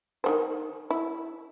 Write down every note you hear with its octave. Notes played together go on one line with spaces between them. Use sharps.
D#3 A#3 C5
E4